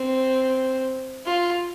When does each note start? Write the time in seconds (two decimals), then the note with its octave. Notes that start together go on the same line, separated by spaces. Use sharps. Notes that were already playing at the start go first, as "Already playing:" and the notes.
Already playing: C4
1.26 F4